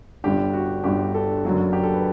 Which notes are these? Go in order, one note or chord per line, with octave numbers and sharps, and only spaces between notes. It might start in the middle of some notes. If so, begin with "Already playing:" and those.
G1 G2 D3 G4
F#4
G1 G2 D3 G4
A4
F#1 F#2 D3 F#3
G4
A4
B4